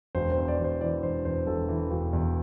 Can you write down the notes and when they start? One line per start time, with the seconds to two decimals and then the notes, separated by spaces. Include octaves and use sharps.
0.15 E1 C5
0.32 C5
0.37 E2
0.48 D5
0.59 E1
0.64 C5
0.81 E3 D5
1.03 E1 C5
1.25 E2 C5
1.47 E1 A4
1.69 E3
1.91 E1
2.13 E2